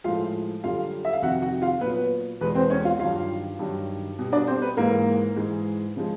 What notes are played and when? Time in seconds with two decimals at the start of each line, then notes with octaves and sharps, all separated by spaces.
0.04 A2 F3 G#3 F4 F5
0.64 F#2 D3 G3 F4 F5
1.05 E5
1.13 F5
1.22 F2 C3 D#3 F#4 F#5
1.42 F#4 F#5
1.62 F4 F5
1.81 A#2 F#3 B3 B4
2.41 E2 B2 G#3 B3 B4
2.55 C4 C5
2.70 C#4 C#5
2.85 F4 F5
2.99 G2 D#3 F#3 F4 F5
3.59 G2 D#3 F#3
4.18 B2 G3
4.32 D4 D5
4.47 C4 C5
4.62 B3 B4
4.77 G#2 E3 G#3 A#3 A#4
5.36 G#2 E3 G#3
5.96 C#3 F3 G#3